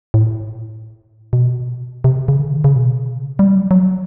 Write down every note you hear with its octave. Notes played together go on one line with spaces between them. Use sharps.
A2
B2
C3
C#3
D3
D#3
C#3
B2
C#3
G3
F#3
F#3